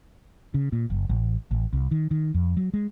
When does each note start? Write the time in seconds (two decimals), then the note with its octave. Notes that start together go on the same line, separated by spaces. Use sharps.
0.54 C#3
0.72 A#2
0.90 F#1
1.09 A1
1.51 A1
1.73 C2
1.91 D#3
2.11 D#3
2.34 F2
2.57 F#3
2.74 G#3